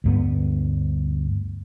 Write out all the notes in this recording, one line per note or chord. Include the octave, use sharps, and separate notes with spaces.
D2 G2 B3